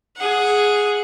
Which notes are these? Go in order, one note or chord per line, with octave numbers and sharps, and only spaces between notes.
G#4 F#5